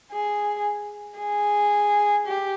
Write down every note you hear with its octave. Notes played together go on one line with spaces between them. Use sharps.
G#4
G#4
G4